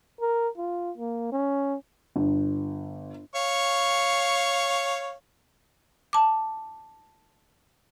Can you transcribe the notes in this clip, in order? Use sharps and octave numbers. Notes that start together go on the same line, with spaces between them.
A#4
F4
A#3
C#4
G1
C#5 F5 C#6
A5 D6